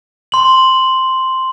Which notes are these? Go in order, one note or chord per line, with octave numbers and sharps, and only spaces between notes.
C6 F#7